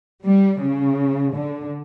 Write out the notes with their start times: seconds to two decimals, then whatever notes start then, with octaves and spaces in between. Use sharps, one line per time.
0.24 G3
0.60 C#3
1.33 D3